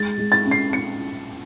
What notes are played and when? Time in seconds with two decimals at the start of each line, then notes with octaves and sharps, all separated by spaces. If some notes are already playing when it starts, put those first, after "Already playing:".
Already playing: G#3 A6
0.18 G#3
0.32 A6
0.45 C#4
0.51 C7
0.73 C#4 C#7